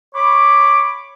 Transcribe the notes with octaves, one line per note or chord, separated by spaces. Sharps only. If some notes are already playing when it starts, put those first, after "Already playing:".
C#5 B5 D6